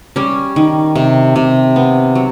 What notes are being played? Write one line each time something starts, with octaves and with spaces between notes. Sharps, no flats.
G3 C#4
D#3
C3
C3
B3
F#3